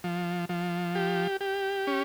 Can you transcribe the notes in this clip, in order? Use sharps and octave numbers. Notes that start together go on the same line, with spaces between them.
F3
F3
G4
G4
C#4